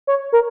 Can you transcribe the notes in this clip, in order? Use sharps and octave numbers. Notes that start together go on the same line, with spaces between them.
C#5
A#4